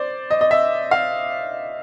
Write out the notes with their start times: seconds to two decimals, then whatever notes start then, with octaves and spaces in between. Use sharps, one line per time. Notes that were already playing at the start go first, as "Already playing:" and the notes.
Already playing: C5 D5
0.31 D#5
0.41 D#5
0.51 E5
0.91 F5